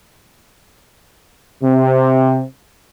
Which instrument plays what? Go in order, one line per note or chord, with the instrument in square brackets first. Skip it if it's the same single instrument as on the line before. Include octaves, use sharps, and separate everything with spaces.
[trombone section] C3